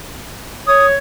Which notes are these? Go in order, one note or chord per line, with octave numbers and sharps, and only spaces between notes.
C#5 D#6